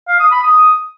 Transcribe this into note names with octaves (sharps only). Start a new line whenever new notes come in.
F5
D#6
B5
D#6